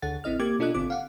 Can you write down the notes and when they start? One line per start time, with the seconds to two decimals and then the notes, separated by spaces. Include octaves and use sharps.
0.02 D2 D3 A4 F#5 A6
0.24 A1 C4 E4 D#5 F6
0.40 A#3 G4 D6 G#6
0.59 B2 D4 F4 A4 D#5 F#6
0.74 G#1 D3 C4 F4 D6
0.90 F5 F#5